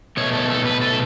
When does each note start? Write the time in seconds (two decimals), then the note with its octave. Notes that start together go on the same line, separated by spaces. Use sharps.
0.17 B2 A3 C#5
0.33 A4
0.50 A4
0.65 B4
0.81 A4